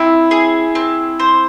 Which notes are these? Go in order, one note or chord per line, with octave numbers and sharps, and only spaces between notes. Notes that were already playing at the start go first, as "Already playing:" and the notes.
Already playing: C4 E4
G#4
C4
C5